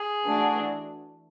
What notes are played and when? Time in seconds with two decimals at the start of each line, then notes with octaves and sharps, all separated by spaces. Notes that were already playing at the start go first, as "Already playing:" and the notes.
Already playing: G#4
0.25 E3 A3 D4 F#4